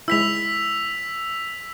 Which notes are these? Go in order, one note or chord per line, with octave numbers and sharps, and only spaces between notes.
G#3 E4 E6 B6 F7